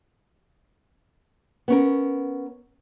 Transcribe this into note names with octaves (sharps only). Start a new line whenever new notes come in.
B3 C#4 A#4